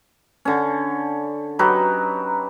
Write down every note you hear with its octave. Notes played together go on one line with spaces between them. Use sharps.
D3 C#4
F#3 D#4 G4 B4